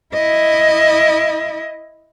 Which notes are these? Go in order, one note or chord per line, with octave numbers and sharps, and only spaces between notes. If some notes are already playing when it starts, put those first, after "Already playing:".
E4 D#5